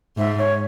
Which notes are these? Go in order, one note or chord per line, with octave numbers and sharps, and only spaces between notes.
G#2 E5
C#5